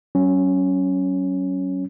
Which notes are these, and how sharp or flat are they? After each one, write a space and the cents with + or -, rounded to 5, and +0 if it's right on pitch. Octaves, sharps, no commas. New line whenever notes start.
F#3 +30 C#4 +0